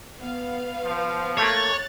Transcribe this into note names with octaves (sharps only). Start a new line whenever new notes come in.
B3 F5
F3
A3 A#3 C#5 F#6 A6